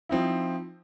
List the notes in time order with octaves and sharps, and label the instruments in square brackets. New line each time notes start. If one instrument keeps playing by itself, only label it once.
[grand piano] F3 C4 D#4 E4